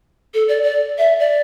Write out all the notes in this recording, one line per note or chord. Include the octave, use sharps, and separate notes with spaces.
A4
D5
D5
E5
D5